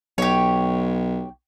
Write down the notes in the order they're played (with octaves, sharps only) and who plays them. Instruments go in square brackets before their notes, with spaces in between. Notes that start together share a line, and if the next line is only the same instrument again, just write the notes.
[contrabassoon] B1 [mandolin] G4 C#5